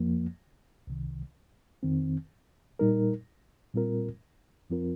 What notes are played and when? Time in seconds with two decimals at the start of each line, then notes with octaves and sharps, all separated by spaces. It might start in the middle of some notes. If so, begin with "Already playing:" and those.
Already playing: F2 F3 A#3
0.87 C2 C3 D#3
1.83 F2 D#3 C4
2.79 A#2 G3 D#4 A#4
3.74 A#2 G3 C4 F4 A#4
4.70 F2 F3 C4 F4 A#4